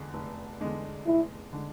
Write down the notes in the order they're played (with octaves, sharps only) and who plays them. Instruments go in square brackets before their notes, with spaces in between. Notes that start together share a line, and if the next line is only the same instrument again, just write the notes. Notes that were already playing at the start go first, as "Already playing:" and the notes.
Already playing: [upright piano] E2 D3 G#3 D4
F1
E2 D3 G#3 D4
[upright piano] F1 [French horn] E4
[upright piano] D3 G#3 D4